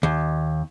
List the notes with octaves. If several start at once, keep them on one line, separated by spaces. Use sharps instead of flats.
D#2